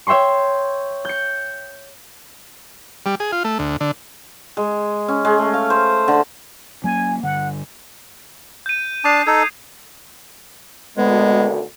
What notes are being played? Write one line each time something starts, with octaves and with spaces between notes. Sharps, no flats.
C#5 E5 G5 C6 C#6
G6 C#7
G3
G#4
F4
A3
D2
D3
G#3
C#4
G#3
A3
F5
C5
D3
F#3 A#3 C#4 G#5
G2 D3 F#5
G6 D#7
D4 A5 D6 D#6 C7
D#4 A4 G#6
G#1 D2 B2 G#3 B3